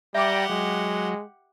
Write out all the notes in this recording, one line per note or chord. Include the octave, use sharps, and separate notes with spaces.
G3 G4 D5 E5 F#5 G5 A#5 D6
F#3 G#3